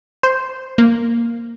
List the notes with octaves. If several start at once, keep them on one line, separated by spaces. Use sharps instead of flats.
C5
A#3